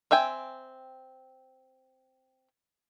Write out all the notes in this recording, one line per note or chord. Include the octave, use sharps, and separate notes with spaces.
C4 E5 G5 G#5